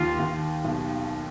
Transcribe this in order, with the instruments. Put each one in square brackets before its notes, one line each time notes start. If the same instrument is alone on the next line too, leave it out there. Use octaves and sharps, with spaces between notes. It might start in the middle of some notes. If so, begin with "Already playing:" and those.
Already playing: [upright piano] D#2 [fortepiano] F4
[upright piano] D#2
B1